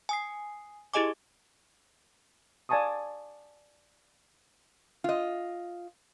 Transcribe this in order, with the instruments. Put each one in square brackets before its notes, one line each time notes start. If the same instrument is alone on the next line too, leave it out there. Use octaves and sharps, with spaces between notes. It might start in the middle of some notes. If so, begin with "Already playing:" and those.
[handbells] G#5 D#6 C7
E4 G4 G#4 D#5 G#5 D6
[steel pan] D5 F5 G#5 A5 C#6 D#6
[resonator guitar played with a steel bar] F4 D#5